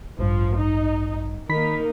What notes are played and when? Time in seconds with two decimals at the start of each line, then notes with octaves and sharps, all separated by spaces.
0.19 A1 G2 F3
0.56 D#4
1.49 D#3 A#3 D#4 A#4 B5 B6